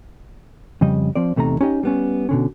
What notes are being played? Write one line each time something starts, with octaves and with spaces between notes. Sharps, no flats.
F2 C#3 G3 D#5
F3 C4 D5
E2 C3 A3 D#4 A#5
C#4 D#4 G4 D#5
G3 B3 C#4
B2 D3 C#4